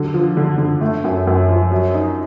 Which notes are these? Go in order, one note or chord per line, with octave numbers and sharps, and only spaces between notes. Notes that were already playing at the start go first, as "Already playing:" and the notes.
Already playing: D3 F#3
F3
D3
D3
A3
F#2
F#2
F3
F#3
D#4